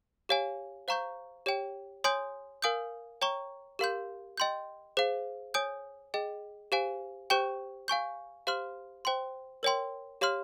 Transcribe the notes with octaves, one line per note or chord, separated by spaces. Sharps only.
G4 C#5 F5 G#5
C5 F5 A#5 C#6 G6
G4 C#5 G5
C#5 G#5 C6 D#6 G6
A#4 F5 G#5 D#6 G6
C#5 G5 A#5 C#6
G4 A#4 F5 C6 G6
D#5 G5 C6 G6
G#4 C5 F5
C#5 G#5 D#6 G6
G#4 D#5 G5
G4 C5 F5 G#5
G4 C5 G5 C#6 G6
F5 G#5 C#6 G6
G4 C5 F5 C6 F6
C5 G5 C6
A#4 C#5 G5 C6
G4 C#5 F5 C6 F6